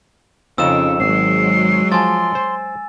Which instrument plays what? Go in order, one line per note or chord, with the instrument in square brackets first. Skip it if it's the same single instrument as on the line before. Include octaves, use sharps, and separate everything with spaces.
[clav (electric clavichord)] F2 D#4 F4 [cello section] C#3 [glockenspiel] E6 E7
[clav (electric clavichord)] G#1 [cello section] F#3 G#3 [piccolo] C7
[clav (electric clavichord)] F3 A5 [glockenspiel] G#5 A6 [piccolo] C6
[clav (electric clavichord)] C5